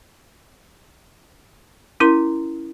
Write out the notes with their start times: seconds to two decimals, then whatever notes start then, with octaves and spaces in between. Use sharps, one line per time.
2.00 C#4 E4 A#4 A#5 C6